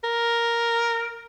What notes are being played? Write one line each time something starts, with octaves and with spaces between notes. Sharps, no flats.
A#4